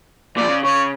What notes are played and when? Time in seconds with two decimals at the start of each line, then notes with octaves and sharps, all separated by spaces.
0.37 A#2 F3 D5
0.49 C#3
0.64 C#3 C#5